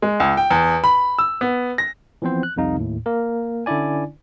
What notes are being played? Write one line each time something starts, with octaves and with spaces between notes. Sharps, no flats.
G#3
C#2
G5
E2
B5
E6
B3
A#6
E3 F3 B3 C4 C5
F#6
C2 F2 C3 D#4 F5
D#2 A2
A#3 A#4
D3 C#4 D4 E4 D5 G#5